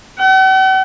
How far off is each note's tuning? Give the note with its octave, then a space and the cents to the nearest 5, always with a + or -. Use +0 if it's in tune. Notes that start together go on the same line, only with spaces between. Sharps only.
F#5 +45